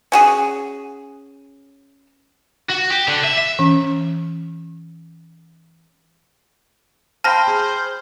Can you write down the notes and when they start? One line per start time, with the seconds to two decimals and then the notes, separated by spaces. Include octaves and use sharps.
0.12 C#4 F#4 G#4
2.70 F#4
2.91 G4
3.08 D3
3.24 E5
3.38 E5
3.59 E3 C#4
7.24 C5 F5 G5 A5 B5 F6 A#6
7.47 G#4